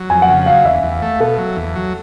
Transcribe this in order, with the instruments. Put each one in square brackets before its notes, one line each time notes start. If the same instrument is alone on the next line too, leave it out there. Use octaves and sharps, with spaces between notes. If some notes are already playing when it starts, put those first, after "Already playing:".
Already playing: [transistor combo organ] F#3
[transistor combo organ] F2 [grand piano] G#5
[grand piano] F#5
[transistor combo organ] C#3
[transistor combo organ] F#3 [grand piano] F5
[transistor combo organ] E2 [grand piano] E5
[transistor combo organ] E2
A3
[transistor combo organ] B2 [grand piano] A4
[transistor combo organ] F#3
E2
F#3